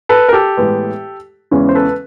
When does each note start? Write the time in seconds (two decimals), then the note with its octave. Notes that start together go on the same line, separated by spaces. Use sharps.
0.09 A4 B4
0.29 A#4
0.33 G4 A4
0.57 A2 E3 G#3 B3
1.51 E2 C#3 E3 G#3 C#4
1.69 C5
1.75 A4 B4